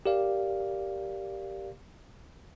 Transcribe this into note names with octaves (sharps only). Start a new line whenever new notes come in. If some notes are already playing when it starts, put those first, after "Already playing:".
G4 A#4 D5 F5